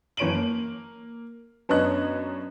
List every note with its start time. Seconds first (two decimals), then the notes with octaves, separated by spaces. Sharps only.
0.17 F#1 E3 C#5 D7 D#7 F#7
0.35 A#3
1.69 F#2 B3 D4 C#5 D#5 F#6